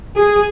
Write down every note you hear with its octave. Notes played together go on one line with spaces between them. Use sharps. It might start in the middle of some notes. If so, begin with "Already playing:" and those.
G#4